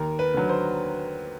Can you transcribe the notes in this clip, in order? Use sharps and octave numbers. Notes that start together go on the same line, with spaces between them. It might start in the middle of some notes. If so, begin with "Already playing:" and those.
Already playing: D#2 A#4
B4
D3 F#3
C5